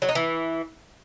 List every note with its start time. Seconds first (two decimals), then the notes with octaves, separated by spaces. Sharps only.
0.02 F#3
0.09 D#4
0.15 E3